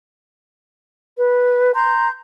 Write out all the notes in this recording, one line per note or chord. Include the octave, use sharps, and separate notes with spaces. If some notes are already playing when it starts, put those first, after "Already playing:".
B4
A#5 C6 G6